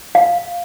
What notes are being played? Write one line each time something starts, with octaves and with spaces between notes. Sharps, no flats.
F5